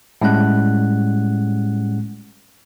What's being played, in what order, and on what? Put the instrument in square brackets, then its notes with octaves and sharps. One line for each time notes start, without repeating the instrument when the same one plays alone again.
[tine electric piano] A2 G3 G#3 C#4 F#5 F#6